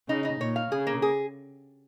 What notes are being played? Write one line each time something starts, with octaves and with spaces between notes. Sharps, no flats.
C#3 D#4
D#4
A#2 C#5
F5
C#3 G#4
A#3
G#4